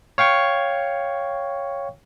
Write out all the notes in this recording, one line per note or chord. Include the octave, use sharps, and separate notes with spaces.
C#5 F5 G5 C#6